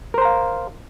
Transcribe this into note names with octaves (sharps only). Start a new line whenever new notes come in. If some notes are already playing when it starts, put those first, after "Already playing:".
A#4 C5 F5 A#5